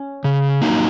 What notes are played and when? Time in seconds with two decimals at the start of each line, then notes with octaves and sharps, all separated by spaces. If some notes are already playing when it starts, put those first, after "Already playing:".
Already playing: C#4
0.24 C#3
0.62 F#3 A#3 D#4